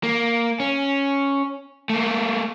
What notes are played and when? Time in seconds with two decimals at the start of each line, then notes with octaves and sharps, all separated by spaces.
0.03 A#3
0.60 C#4
1.90 A3 A#3